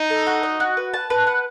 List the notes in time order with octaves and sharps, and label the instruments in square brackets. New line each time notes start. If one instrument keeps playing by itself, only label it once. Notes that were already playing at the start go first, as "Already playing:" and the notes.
Already playing: [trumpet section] D#4
[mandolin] A4
F#4
D#5
F#4
B4
A5
B4
F#5